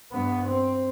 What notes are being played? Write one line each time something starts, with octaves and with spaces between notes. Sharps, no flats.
G2 B3
C4